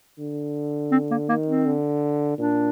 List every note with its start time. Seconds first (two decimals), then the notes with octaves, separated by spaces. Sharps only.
0.19 D3
0.92 C4
1.11 A#3
1.29 D#3 A#3
1.47 C4
1.66 D3
2.39 A#2 D4